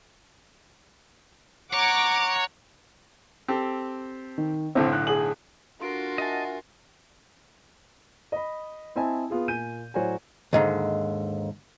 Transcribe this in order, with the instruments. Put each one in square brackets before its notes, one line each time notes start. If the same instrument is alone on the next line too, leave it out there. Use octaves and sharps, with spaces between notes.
[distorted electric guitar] C#5 [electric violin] F#5 A#5 [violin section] D6
[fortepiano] C4 G4 A4
[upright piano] D#3
[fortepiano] B1 A2 D3 [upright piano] C4
[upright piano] F#6
G#4 G#5 F#7
[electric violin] D4 F#4 [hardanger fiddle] F4 A#4 [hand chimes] A4 C6 D7
[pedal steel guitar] D#5 A5 [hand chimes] E5 F#5 G#5
[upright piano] D#5 B5
C4 E4 D#5 G#5 A5
B3 F4 G#4
A#2 G#5 G6 D#7
A2 F#3 F#4 C5 D5 G#5
[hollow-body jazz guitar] D#2 G#2 D3